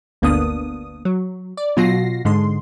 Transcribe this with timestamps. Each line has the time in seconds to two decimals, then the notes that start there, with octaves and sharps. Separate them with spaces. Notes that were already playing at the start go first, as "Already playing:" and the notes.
0.22 G1 D2 A#3 B3 D4 D#6
1.05 F#3
1.57 D5
1.77 B2 F#3 F4 F#4 A#6 C7
2.25 G#2 D3 G#3 C6